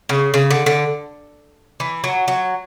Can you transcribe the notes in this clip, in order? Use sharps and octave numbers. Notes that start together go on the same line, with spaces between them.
C#3
C#3
D3
D3
E3
F#3
F#3